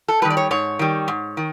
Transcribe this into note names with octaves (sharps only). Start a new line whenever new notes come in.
A4
D#3 G3 B4
D5
C#5
G#2 C#5
D#3 G3
G#2
D#3